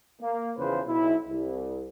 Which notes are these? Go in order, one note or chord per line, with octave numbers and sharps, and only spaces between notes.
A#3
E2 C#3 F3 B4 C5
B1 E4
C2